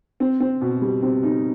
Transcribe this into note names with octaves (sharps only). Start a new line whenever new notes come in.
C4
C4
B2
G3
C4
D#4